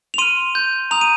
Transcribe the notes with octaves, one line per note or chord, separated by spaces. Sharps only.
F7
C6 F6 D#7
C6 G6
A#5 D#6 G6 F7
D#7